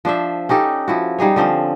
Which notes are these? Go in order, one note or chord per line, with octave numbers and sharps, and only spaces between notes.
F3 D4 C5 E5
C#4 D#4 G4 A4
F3 E4 F#4
G3 D#4 G#4 C#5
D3 F3 C4 C#4